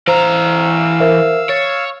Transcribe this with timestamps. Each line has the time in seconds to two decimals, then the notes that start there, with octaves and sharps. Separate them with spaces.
0.07 E3 C5 F5 A#5 E6
1.00 A#4 C5 E5
1.49 C#5 A6